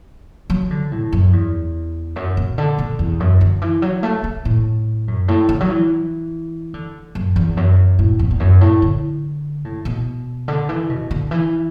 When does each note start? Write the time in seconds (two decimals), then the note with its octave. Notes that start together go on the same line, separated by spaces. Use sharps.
0.50 F#3
0.71 D3
0.92 A2
1.12 F#2
1.33 E2
2.16 F#2
2.37 B2
2.58 D3
2.78 B2
2.99 E2
3.20 F#2
3.41 D3
3.62 E3
3.82 F#3
4.03 A3
4.24 A3
4.45 A2
5.08 F#2
5.28 A2
5.49 D3
5.60 F#3
5.70 E3
6.74 D3
7.15 F#2
7.36 E2
7.57 F#2
7.99 A2
8.19 E2
8.31 E2
8.40 F#2
8.61 A2
8.82 D3
9.65 A2
9.85 B2
10.48 D3
10.69 E3
10.90 B2
11.11 D3
11.31 E3